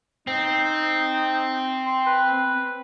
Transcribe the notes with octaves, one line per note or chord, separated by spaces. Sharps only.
C4 D#4
C6
B4